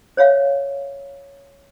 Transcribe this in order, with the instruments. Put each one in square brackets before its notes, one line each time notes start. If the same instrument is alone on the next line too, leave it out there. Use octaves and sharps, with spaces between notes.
[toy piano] C5 C#5 E5 F5